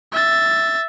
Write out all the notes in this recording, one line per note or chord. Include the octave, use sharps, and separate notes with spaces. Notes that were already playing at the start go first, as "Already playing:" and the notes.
E5 A6